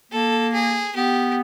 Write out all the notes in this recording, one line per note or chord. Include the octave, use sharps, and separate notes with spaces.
A#3 A4
G#4
B3 G4